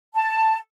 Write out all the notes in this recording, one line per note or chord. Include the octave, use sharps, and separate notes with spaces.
A5